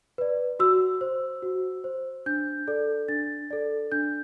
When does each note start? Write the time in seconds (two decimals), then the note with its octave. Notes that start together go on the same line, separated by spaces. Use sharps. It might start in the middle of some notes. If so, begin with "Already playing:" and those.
0.18 B4 D5
0.60 F#4 E6
1.01 C5
1.43 F#4
1.84 C5
2.26 D4 G6
2.68 A4 D5
3.08 D4 A6
3.50 A4 D5
3.92 D4 G6